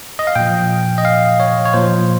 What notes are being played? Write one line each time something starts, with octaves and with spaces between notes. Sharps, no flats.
D#5
F5
A#2 F3 G5
D#5
F5
C#5
C#5
A#2 F3 C5